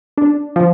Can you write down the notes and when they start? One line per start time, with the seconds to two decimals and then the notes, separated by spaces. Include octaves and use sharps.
0.18 D4
0.56 F3